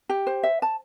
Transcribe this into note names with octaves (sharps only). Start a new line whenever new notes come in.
G4
C5
E5
A5